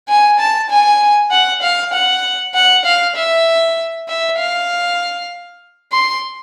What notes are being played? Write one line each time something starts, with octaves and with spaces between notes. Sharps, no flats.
G#5
A5
G#5
F#5
F5
F#5
F#5
F5
E5
E5
F5
C6